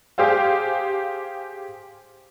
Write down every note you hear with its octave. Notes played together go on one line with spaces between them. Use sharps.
G4 G#4 C5 F5